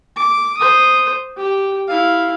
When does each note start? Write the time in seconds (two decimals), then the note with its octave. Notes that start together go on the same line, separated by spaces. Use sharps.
0.16 D6
0.57 C5 D#6
1.37 G4
1.89 E4 F5